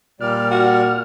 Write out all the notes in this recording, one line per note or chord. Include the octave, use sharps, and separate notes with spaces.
A#2 G3 D5 F6
F#4